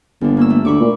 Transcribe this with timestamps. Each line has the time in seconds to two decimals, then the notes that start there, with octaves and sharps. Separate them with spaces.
0.21 G1 D#2 D4
0.37 A#3 C#4 E6
0.50 A3
0.65 D2 B5 C#6 D6
0.81 A#2